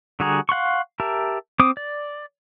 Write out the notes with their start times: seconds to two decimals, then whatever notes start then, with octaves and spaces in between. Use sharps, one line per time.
0.20 D3 G3 F#4 G#4 A#5
0.49 F5 F#5 C6 C#6
1.00 G4 A#4 E5 A5
1.59 C4 D6 D#6
1.77 D5